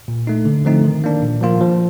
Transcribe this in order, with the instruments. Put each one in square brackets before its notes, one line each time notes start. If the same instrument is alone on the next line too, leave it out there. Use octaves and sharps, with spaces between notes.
[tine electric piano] A#2
A3 D#4
D3
F3 A3 C4 D#4
D#3
A#3 D4
A#2
F3 A#3 F4
F3